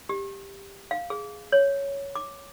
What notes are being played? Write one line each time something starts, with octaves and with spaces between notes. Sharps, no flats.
G4
F5
G#4
C#5
D6